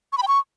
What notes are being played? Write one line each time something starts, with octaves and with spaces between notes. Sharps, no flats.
C#6
B5
G5
C#6